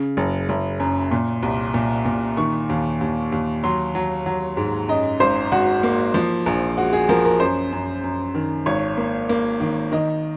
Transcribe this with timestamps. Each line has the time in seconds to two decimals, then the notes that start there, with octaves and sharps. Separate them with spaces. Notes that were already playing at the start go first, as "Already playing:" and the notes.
Already playing: C#3
0.17 F#1
0.49 F#1
0.80 F#2
1.11 A#2
1.43 C2
1.74 A#2
2.05 A#2
2.37 D#3 C#6
2.69 D#2
3.01 D#2
3.32 D#2
3.64 F#3 C6
3.95 F#3
4.26 F#3
4.57 G#2
4.88 F#2 D#5
5.20 G#1 C5
5.52 G#1 F#4
5.83 A#3
6.14 F3
6.46 A#1
6.78 G#3 F#4
6.93 G#4
7.09 F3 A#4
7.25 A#4
7.40 F#2 C5
7.72 F#2
8.04 F#2
8.35 D#3
8.66 G#1 C#5
8.97 A#3
9.29 A#3
9.60 D#3
9.92 D#3 D#5